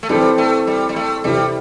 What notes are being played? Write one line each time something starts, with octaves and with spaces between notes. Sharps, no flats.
A3
E3 G3 C4 A4 C5
A3
G3
G3
A3
C3 E3 G3 C4 E4 G4